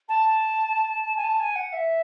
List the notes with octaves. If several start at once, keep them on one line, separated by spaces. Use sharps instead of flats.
A5
G#5
A5
G#5
F#5
E5